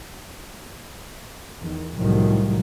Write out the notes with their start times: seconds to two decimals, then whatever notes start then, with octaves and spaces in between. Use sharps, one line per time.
1.59 E2 D#3
1.96 C2 A2 D#3 F3 F#3